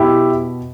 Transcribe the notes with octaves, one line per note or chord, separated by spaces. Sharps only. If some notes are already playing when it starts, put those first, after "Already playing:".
Already playing: B2 E4 G4